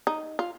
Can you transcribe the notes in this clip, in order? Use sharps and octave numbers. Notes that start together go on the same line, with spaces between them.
D#4
F4